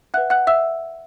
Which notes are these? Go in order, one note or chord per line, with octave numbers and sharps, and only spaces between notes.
B4 E5 F#5 F#6
F#5 F#6
E5 E6